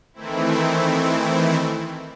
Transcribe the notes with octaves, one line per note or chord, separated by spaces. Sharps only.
D#3 E3 A3 C4 E4